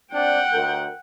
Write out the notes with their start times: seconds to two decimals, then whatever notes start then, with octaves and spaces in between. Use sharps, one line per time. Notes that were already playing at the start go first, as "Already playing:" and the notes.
0.13 C4 D4 F#5 G5
0.53 D2 A#4